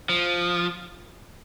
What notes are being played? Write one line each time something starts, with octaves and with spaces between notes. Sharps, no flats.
F3